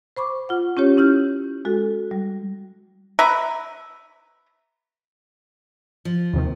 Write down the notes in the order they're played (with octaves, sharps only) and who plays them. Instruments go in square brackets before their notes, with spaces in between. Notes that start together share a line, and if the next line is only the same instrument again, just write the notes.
[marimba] C5 B5 C#6 D6
F4 F#5
C#4 F4 G4 C#5
C#4 E4 F6 G6
G#3 F#4 A4
G3
[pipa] B4 E5 A#5
[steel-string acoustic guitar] F3
[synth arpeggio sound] D#2 C3 D#3